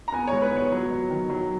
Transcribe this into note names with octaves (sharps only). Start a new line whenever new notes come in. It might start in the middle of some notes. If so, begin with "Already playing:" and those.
A#5
B3 G#5
G#2 C#5
B4
B3 C#5
F#3
F#3
D#3
F#3